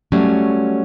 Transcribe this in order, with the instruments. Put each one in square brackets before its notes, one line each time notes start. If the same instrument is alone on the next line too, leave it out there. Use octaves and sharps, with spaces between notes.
[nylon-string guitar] F#3 G3 A3 C#4